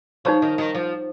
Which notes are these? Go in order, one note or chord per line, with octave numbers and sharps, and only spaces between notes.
F3 D#4 C#5 A#5 C#6
D#3
D#3
F3